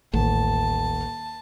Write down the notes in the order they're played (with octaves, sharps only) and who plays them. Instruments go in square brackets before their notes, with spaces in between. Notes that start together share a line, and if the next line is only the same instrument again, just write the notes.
[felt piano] D#1 [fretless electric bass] A1 [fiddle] A5